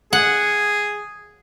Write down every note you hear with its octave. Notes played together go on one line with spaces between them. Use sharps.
G#4 F#5